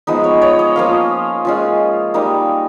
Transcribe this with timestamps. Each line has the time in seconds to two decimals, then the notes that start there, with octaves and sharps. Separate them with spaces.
0.07 F3 G#3 B3 D#4
0.24 C#5
0.42 C#5
0.59 D#5
0.76 F3 A#3 C#4 F5
1.45 G#3 C#4 F4
2.14 G3 A#3 D#4